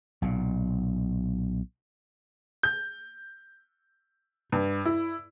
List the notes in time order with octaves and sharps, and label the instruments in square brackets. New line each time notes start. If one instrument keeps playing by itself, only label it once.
[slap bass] B1 A#2
[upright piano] G6
G2
E4